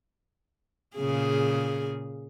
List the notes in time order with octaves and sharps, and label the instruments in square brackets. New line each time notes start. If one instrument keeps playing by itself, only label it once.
[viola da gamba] A#2 C#3 G#4